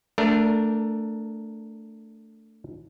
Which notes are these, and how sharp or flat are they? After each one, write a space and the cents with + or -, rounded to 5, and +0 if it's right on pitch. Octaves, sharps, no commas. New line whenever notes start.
A3 +10 D4 -5 A#4 +0